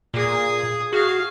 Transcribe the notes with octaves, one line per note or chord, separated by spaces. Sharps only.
A#2 G#4 D#6
F#4 G#4 F5